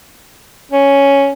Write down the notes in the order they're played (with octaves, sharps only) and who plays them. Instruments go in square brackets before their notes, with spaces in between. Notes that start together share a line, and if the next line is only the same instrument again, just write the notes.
[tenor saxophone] C#4